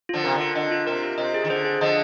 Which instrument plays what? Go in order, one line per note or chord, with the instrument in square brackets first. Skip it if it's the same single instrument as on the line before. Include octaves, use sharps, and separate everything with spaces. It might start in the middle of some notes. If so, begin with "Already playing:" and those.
[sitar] D3 F3 [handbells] F4
[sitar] C3 [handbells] A#4
[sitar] D3
[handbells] F4
[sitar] D3 [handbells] D#5
[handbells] F4
[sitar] C3 [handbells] A#4
[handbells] F4
[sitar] C3 [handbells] D#5
[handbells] G#4
[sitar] D#3
[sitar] D3 [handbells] C5
[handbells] G#4
[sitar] D3 F3 [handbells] D#5